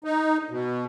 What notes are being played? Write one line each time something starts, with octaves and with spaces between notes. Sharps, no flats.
D#4
B2